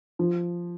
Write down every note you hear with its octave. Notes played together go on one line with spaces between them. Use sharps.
F3